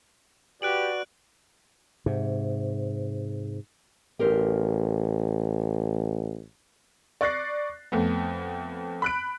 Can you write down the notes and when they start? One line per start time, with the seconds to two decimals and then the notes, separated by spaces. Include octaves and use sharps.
0.62 F#4 G4 B4 D5 F#6 D7 F#7
2.06 G#2 C3
4.19 A1 G4 A#4 C5
7.21 D5 C#6 F#6 A6 A#6 C7
7.92 F2 A3 B3
9.02 B5 F#6 D7